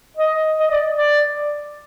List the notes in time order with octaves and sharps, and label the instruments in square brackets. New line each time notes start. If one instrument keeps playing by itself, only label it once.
[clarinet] D#5
D#5
D5
D5